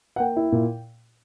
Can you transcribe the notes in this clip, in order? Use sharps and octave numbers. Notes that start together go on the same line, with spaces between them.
F#5
A#3 G5
E4
A#2